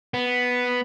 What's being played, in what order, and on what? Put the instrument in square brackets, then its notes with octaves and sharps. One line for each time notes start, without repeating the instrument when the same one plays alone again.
[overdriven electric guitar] B3